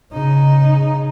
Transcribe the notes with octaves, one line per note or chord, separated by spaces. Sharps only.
C#3 D#4